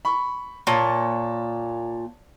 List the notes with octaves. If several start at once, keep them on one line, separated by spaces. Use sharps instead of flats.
B5 C#6
A#2 C#5 A5